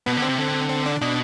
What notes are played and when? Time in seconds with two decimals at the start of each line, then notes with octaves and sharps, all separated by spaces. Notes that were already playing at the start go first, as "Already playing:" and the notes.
0.06 B2 B3
0.17 D3
0.22 C4
0.29 C3
0.38 D3
0.70 C4
0.86 D4
1.02 B2 D4